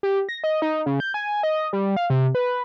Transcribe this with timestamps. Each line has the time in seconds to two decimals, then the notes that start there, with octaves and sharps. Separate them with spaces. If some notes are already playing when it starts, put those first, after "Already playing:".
0.03 G4
0.29 A#6
0.44 D#5
0.62 D#4
0.86 C#3
1.00 G6
1.14 G#5
1.43 D#5
1.73 G3
1.96 F5
2.10 C3
2.35 B4